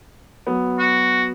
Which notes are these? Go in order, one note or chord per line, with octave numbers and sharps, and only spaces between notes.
F#3 B3
F#4